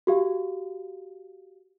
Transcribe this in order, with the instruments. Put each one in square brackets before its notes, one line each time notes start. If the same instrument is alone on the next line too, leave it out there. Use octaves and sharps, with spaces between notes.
[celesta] F#4 G4 F5